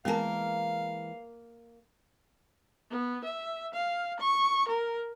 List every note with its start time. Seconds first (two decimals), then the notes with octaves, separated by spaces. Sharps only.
0.05 E3 G#3 A#3 B3 A#4 F5 G#5 A5
2.91 B3
3.24 E5
3.73 F5
4.19 C#6
4.68 A#4